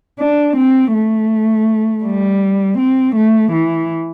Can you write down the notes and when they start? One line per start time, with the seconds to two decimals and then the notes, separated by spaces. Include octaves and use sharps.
0.20 D4
0.57 C4
0.93 A3
2.04 G3
2.78 C4
3.16 A3
3.52 E3